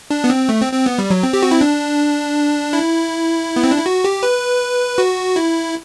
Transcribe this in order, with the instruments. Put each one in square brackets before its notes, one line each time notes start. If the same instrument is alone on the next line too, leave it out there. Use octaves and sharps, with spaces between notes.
[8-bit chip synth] D4
B3
C4
A3
C4
C4
B3
G3
F#3
C4
G4
F#4
E4
D4
E4
B3
C4
D4
E4
F#4
G4
B4
F#4
E4